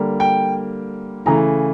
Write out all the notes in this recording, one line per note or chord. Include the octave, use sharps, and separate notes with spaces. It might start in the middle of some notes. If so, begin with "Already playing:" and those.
Already playing: D3 G3 A#3
G5
C#3 E3 A3 A#5